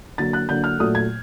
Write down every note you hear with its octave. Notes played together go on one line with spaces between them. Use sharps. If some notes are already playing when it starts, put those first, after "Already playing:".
D3 F#3 A#3 A6
F#6
D3 F#3 A#3 G6
F6
A#2 F#3 A3 D#6
G#6